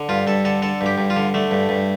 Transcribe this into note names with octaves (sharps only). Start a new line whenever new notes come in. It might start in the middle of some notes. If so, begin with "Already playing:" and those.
Already playing: D3
G2 F4
G2 A4
D3 A4
D3 A4
G2
G4
G2
F4
D3
D3 A3
G2
G2